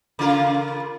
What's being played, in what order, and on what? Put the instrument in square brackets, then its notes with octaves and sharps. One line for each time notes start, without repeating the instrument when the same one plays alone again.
[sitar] C#3 F4 A#4